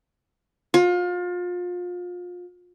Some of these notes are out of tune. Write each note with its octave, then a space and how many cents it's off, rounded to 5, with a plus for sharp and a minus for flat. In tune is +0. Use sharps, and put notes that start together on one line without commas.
F4 +30